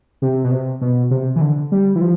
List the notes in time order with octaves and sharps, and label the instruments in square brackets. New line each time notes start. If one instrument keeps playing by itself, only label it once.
[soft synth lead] C3
B2
C3
B2
C3
E3
D3
G3
E3
F3